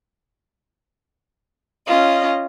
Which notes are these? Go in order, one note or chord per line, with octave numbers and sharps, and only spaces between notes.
C#4 F4 D#5